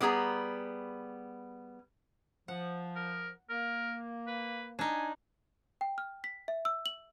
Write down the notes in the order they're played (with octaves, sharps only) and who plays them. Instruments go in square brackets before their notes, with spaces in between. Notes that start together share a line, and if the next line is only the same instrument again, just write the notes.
[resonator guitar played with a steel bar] G3 B3 G#4 A#5
[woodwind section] F3 [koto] F#5
[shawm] A#4
[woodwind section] A#3 [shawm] A#4
[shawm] B4
[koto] D4 D#4 [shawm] G#5
[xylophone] G5
F6
B6
E5
E6
F#7